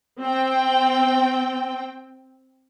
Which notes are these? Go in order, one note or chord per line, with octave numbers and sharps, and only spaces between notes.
C4 G5